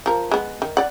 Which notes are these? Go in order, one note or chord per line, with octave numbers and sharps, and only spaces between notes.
F3 A#4
G#3 B3
D#3
D5 F#5